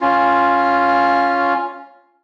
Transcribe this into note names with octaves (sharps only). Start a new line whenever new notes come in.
C#4 F4